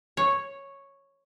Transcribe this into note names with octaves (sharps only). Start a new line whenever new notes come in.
C#5